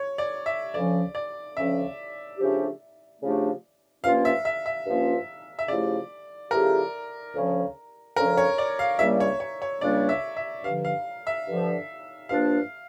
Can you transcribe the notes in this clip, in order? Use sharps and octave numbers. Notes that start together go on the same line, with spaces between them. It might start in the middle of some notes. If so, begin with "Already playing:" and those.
Already playing: C#5
D5
E5
D2 C#3 F3 C#4 D5
D5
D2 C#3 F3 C#4 E5
C#3 F3 A3 D4 G4
C#3 F3 A3 D4 G4
G2 F3 A#3 C#4 F4 F5
E5
E5
E5
G2 F3 A#3 C#4 F4
E5
C#3 F3 A3 E4 G4 D5
C#3 F3 A3 E4 G4 A#4
D2 C#3 F3 C#4
D2 C#3 F3 C#4 A#4
C#5
D5
F5
C#2 C#3 G3 A#3 D4 E5
C#5
C#5
C#5
C#2 C#3 G3 A#3 D4 D5
E5
E5
G2 D3 F3 F5
F5
E5
G2 D3 F3
G2 F3 A#3 D4 F5